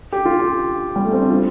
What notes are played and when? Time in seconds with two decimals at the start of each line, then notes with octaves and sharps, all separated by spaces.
0.12 G4
0.25 F4
0.40 G4
0.96 G3
1.05 A3
1.13 C4
1.21 D4
1.30 F4